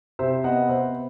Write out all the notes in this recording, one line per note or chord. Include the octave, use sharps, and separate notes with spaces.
C3 C5 E5
B3 D#5 F#5
C3 C5 E5